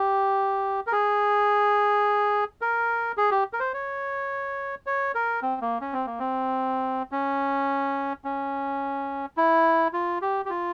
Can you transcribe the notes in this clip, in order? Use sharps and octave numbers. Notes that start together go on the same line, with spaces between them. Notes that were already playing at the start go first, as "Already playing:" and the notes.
Already playing: G4
A#4
G#4
A#4
G#4
G4
A#4
C5
C#5
C#5
A#4
C4
A#3
C#4
C4
A#3
C4
C#4
C#4
E4
F4
G4
G4
F4